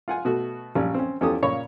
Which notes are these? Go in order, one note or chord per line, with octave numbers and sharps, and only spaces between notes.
F4 F#5 G#5
B2 A3 F#4
A#1 F3 G3 C#4 A#5
C4 C#4
E2 F3 C#4 G4 A4 D#6
A#2 C#3 C#5 B5 C#6